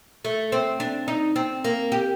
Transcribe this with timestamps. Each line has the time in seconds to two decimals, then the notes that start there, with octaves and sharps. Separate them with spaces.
0.25 A3
0.52 C4
0.80 D4
1.08 D#4
1.36 C4
1.64 A#3
1.92 G4